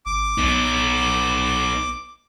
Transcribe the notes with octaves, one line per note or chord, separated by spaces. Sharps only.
G#1 D6
B1 B3 D#4